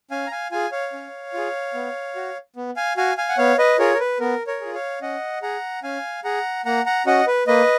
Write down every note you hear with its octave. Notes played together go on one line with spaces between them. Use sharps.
C#4 F5 G#5
A#5
F5 G#5
F4 G#4 F5 G#5
C#5 F5
C#4
F4 G#4
B3
F#4
B3
F5 G#5
F#4 F5 G#5
F5 G#5
F#5
B3 C#5 F5
B4 D#5
F4 G#4 A#4 C#5
A#4
B4
B3 A#4
A#4 C#5
F4 G#4
C#5 F5
C#4 D#5 F#5
G#4 F#5 A#5
C#4 F5 G#5
G#4 F#5 A#5
A#3 F#5 A#5
F#5 A#5
C#4 F#4 D#5 F#5
B4
A#3 B4 D#5